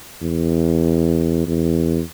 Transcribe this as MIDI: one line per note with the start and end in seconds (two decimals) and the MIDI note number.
0.22 1.43 40
1.47 2.01 40